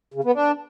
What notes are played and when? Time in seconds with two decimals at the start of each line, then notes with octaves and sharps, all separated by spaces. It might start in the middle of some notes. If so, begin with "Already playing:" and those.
0.14 C#3
0.24 B3
0.34 D4